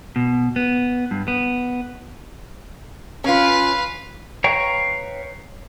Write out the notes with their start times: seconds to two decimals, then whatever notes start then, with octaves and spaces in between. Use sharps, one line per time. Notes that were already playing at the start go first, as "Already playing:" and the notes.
0.16 B2
0.56 B3
1.11 G2
1.28 B3
3.24 C#4 F4 B4 F5
4.44 B4 C#5 F5 G5 A#5